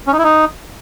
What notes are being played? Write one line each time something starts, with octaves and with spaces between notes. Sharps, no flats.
C#4
D#4
E4
D#4